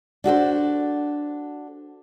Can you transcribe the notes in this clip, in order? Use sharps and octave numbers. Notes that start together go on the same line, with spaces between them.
D4 F#4 A4 C5